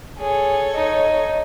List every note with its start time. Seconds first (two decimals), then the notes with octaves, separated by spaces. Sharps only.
0.19 G#4 A4 C#5
0.75 D#4